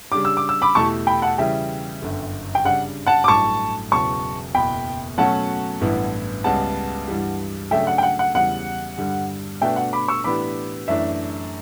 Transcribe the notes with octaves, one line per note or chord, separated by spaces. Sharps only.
C#3 G3 D4 G4 D6
E6
D6
E6
B5 D6
E2 B2 A3 E4 G4 A5 C#6
G5 B5
F#5 A5
C#3 E3 G3 E5 G5
G1 F#2 D3
G5
C#3 G3 D4 F#5
F#5 A5
D6
A1 G2 F#3 A3 E4 A5 C#6
E1 E2 C#3 F#3 B3 A5 C#6
F#1 E2 B2 G5 B5
B2 F#3 A3 C#4 F#4 F#5 A5
A1 G2 E3 B3 E4
C#2 C#3 G3 B3 F#5 A5
G2 E3 G3
C#3 F#3 A3 D4 A4 E5 G5
F#5
G5
F#5
F#5
E2 C#3 E3 G3 F#5
G2 D3 G3
B2 A3 D4 F#4 B4 E5 G5
F#5
B5 D6
C#6 E6
A2 E3 B3 D4 G4 B5 D6
F#2 E3 A3 D4 E5